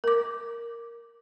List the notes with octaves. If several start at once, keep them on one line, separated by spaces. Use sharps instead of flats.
A#4 D6